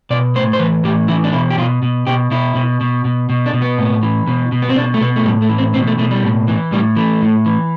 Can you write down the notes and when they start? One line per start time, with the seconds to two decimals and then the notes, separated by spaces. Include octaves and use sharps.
0.10 B2 D5
0.35 A2 C5
0.53 C5
0.59 E3 B4
0.84 A2 G4
1.08 E3 E4
1.24 D4
1.33 B2 E4
1.51 G4
1.58 B2 F4
1.83 B2
2.07 B2 G4
2.31 B2 E4
2.55 B2
2.81 B2
3.05 B2
3.30 B2
3.46 D4
3.53 B2
3.62 B3
3.78 A2
4.03 E3
4.27 B2
4.52 B2
4.62 B3
4.69 C4
4.76 B2 D4
4.94 A3
5.01 B2 B3
5.16 A3
5.25 A2 G3
5.42 A3
5.49 E3
5.58 C4
5.74 B2 C4
5.87 A3
5.98 B2 A3
6.11 G3
6.24 A2
6.48 E3
6.72 A2 G3
6.96 E3 A3
7.22 A2
7.46 E3